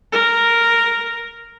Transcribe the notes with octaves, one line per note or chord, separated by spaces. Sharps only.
A#4